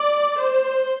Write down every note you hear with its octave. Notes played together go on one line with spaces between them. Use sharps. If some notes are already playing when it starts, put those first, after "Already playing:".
Already playing: D5
C5